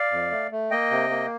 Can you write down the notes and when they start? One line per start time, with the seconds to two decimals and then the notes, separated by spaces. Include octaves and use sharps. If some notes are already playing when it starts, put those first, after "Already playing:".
Already playing: D5 F5
0.12 F2
0.32 A3
0.51 A3
0.71 A#3 D#5 G5
0.91 C3
1.10 A#3